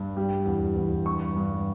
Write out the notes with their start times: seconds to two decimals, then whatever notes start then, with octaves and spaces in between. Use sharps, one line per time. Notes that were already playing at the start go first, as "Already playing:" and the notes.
Already playing: G2
0.17 G3
0.46 E2
0.76 E2
1.06 G2 C#6
1.36 G2